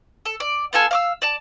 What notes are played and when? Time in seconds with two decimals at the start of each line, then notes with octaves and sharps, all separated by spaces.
0.25 A4
0.40 D5
0.73 B3 F4 A4 G#5
0.91 F5 D6 E6
1.22 D5 A5